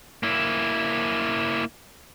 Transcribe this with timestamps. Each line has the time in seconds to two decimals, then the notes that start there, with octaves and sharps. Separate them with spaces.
0.23 A#3 E4